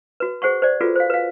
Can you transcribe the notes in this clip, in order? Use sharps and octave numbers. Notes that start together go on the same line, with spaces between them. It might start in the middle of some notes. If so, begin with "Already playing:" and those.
F#4 B4
G#4 C5 F#5 C#6
C5 D5
F4 F#4 G#4 A4 B4
C5 F5
B4 F5